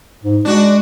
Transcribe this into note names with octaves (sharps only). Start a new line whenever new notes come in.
G#2
G#3 D4 F#4